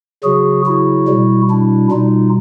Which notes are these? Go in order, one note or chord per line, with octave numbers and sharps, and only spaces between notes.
C#3 F#3 F#4 G#4
E4 F#4
B2 G3
D4 E4
B2 G3 D#4 F4